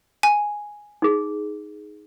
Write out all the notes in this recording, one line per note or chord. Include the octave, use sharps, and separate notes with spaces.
G#5
D#4 G#4